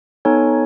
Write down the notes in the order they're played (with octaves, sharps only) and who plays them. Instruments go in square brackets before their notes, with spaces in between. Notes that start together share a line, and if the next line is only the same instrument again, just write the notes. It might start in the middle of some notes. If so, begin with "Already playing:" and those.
[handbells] B3 D#4 A4 C#5 G#5